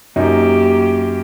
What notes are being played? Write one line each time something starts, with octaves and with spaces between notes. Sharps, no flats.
F#2 A#3 D#4 G4